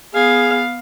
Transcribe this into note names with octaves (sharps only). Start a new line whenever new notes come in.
B3 G#4 F5